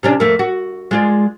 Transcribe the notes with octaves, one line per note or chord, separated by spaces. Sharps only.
C3 C#4 D4
F2 A3 A#3
F#4
G#3 F4 D5